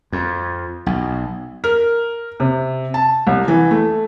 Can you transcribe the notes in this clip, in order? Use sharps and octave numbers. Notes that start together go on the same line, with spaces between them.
F2
B1
A#4
C3
A5
C2
E3
A3